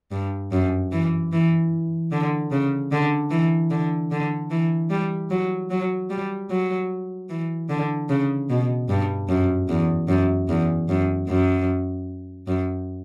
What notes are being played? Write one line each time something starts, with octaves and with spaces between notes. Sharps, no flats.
G2
F#2
E3
E3
D3
C#3
D3
E3
D3
D3
E3
G3
F#3
F#3
G3
F#3
E3
D3
C#3
B2
G2
F#2
E2
F#2
E2
F#2
F#2
F#2